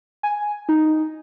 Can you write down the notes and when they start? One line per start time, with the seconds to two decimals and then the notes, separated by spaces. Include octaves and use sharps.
0.23 G#5
0.69 D#4